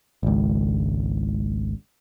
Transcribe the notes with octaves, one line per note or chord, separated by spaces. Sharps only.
G#1 C#2